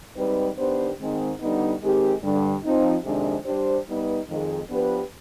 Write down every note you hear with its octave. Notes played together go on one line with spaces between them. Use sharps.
G#2 G3 C4 D#4 B4
D#3 B3 D4 G4 C5
G#2 D#3 G#3 C4
D3 G3 B3 D#4
D#3 G#3 C4 G4
G2 D3 G3
F3 C4 D#4
F2 C3 D#3 G#3 D4
G3 D4 G4 C5
G3 B3 D#4 B4
F2 D#3 G#3
F3 B3 D4 G4 B4